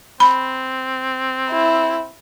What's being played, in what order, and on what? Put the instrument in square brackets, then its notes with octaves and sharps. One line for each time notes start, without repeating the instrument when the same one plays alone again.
[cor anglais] C4 [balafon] B5
[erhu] E4